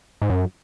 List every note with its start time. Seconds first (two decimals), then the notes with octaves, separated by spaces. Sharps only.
0.22 G#2
0.30 F#2